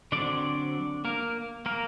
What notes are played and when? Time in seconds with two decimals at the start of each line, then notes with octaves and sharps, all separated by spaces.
0.12 D3 F#3 C4 D4 D5
1.05 A#3 A#4
1.66 A#3 A#4